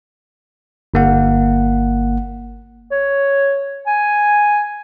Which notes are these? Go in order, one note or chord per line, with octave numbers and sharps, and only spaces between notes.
G1 A#3 F#5
C#5
G#5